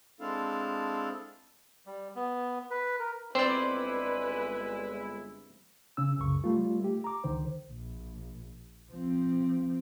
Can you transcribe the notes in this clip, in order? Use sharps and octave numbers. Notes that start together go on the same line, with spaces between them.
G#3 C4 D4 E4 A4 F5
G3
B3
B4
A#4
G1 G#3 C4 E4 B4 C5 D5
C#3 C#4 E6
C2 F#2 C#3 C#6
G3 A3 F4
A3 G4
A#5 D6
C#2 D3 D#3 C5
A#1
F3 C4